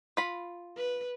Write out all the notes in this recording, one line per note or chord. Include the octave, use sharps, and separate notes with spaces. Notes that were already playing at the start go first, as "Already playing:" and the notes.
F4 B5
B4